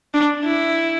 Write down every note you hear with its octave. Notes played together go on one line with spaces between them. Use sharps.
D4
E4